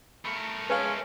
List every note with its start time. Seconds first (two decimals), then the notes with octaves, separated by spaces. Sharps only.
0.25 A3 A#4 B5 C#7
0.70 G#3 C#4 B4 F5